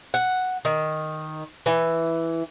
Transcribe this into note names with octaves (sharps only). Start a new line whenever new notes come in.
F#5
D#3
E3